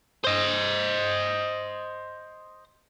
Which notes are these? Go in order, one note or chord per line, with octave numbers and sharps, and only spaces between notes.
C5 D#5